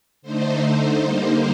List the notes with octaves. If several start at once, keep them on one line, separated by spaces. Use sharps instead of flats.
D3 A3 D#4 C5
C5
D3 G3 A#3 D#4 C5